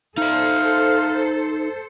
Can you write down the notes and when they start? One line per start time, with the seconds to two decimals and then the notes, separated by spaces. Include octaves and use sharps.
0.18 D#4 A4 C5 E5 F5